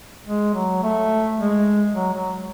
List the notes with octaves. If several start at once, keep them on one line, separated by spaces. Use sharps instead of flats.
G#3
F#3
A3
G#3
F#3
F#3